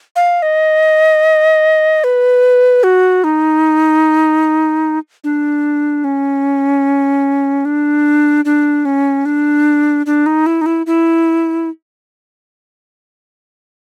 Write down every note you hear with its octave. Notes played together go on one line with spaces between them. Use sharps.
F5
D#5
B4
F#4
D#4
D4
C#4
D4
D4
C#4
D4
D4
D#4
E4
D#4
E4
E4